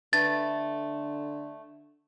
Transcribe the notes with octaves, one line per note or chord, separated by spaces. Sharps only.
D3 A3 B4 A6